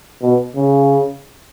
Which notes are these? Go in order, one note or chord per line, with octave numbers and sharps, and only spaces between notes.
B2
C#3